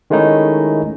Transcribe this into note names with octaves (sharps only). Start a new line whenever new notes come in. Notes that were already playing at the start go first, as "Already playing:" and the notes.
D#3 G#3 A3 C#4 D#4 E4